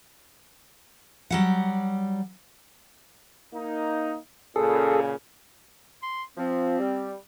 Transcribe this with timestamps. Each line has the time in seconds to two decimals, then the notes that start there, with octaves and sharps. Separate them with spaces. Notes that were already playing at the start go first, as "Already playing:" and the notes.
1.31 F#3 G3 F#5
3.53 A#3 D#4
4.56 A#2 C#3 G#4 A4
6.03 C6
6.37 F3 C4
6.79 G3